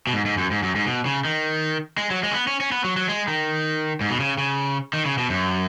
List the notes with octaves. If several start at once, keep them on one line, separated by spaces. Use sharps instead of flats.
B2
G#2
G#2
F#2
G#2
F#2
G#2
B2
C#3
D#3
G#3
F#3
G#3
C#4
B3
C#4
C#4
B3
F#3
F#3
G#3
D#3
G#2
B2
C#3
C#3
D#3
C#3
B2
F#2